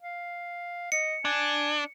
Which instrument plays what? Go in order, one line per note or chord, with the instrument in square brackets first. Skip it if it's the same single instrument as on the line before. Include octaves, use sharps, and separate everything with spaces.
[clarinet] F5
[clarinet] D#5 [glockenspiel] C#7
[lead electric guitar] D4 [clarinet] G#5